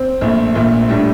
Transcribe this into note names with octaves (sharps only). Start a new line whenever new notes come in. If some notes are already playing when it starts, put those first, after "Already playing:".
Already playing: C4
A#1 A#2 A3
A#1 A#2 A3
A2 G3 D4